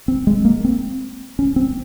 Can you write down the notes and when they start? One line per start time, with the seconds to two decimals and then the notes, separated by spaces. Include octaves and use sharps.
0.08 C4
0.27 G#3
0.45 A#3
0.65 C4
1.39 C#4
1.56 C4